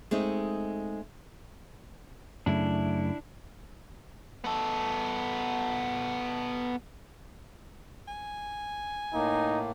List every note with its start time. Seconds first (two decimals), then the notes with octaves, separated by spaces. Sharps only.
0.11 G#3 A3 C4 D#4
2.46 F#2 C#3 A3 D4 E4
4.45 B3 A4
8.08 G#5
9.14 A2 A#3 D#4